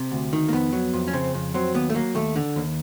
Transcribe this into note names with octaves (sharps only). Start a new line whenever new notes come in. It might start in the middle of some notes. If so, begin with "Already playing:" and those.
Already playing: C3 C4
D2
D#3
A#3
F2 B3
F#3
F2
C#4
C#3 C4
F2
F#3 C4
D#2 B3
A3
F#3 A#3
D#2 A3
D3
D#2